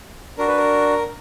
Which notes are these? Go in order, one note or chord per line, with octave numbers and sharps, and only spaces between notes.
D4 F#4 A#4
B4
A#4